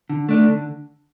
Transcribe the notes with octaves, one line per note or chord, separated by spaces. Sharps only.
D3
A3 D4
D3